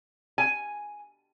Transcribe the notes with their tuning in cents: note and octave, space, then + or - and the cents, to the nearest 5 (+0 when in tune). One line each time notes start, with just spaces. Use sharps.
G#5 +0